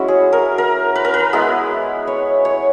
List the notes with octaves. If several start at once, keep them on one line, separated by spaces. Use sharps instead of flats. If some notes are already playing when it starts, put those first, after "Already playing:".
Already playing: G#3 C#4 E4 F#4
G#4
A#4
A#4
B4
A#4
B4
G#3 B3 E4
C#5
C#5